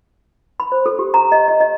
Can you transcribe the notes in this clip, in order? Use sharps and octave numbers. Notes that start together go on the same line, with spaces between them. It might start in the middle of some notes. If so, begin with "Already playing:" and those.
B5
C5
A4
G4
A#5
D#5
D#5
D#5